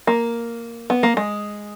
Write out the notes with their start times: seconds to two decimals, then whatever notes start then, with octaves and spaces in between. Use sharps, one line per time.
0.07 A#3
0.90 B3
1.03 A#3
1.17 G#3